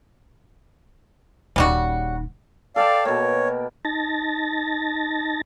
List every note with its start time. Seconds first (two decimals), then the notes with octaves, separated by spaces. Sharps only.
1.56 D#1 C#3 G3 D#4 F#4
2.76 A4 D5 F5 G5 A5
3.05 B2 A#3 C#5
3.85 D#4 A5 A6 A#6